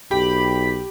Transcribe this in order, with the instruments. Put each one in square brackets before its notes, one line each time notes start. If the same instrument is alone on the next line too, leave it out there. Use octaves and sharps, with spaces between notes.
[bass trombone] B1 [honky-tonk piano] G4 [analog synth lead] B5